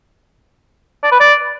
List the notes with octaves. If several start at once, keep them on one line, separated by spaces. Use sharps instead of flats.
D5
B4
D5